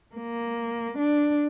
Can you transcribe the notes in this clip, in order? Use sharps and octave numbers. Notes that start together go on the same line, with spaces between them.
A#3
D4